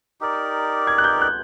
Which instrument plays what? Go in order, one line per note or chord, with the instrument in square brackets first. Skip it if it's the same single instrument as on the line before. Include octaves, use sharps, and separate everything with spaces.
[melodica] D#4 G4 A#4 D5
[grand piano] G#6
F#6
G6
F#6